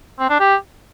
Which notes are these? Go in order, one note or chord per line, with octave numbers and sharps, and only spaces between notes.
C4
D4
G4